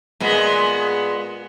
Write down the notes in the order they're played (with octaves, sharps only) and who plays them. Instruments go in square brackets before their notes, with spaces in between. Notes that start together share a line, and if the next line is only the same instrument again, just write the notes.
[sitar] A#2 G#3 B3